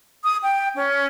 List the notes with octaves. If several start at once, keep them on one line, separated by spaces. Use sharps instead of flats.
D#6
G5
C#4